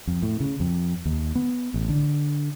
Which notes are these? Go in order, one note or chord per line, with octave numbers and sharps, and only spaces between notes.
F2
A2
C#3
F2
D#2
B3
A1
D3